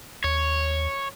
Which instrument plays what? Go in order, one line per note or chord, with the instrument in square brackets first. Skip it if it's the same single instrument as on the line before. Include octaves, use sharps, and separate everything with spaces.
[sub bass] D#2 [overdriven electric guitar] C#5